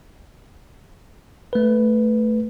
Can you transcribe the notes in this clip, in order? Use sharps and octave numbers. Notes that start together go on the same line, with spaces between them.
A3 B4